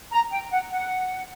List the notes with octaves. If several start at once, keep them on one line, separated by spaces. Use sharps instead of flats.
A#5
G5
F#5
F#5